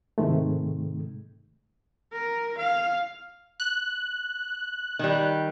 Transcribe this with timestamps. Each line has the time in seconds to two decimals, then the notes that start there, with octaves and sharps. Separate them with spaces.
0.18 G#2 C3 D#3 G#3 A3
2.12 A#4
2.58 F5
3.60 F#6
4.99 D#3 G3